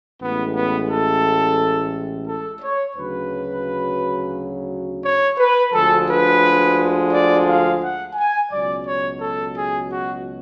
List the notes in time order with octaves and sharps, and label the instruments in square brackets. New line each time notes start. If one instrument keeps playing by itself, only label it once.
[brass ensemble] A1 A2 G#3 B3
B3
A4
A4
C#5
D2 C#3 F#3 B4
C#5
B4
D2 D3 F3 G#3 A4
B4
D5
F5
F#5
G#5
C#2 B2 F#3 D5
C#5
A4
G#4
F#4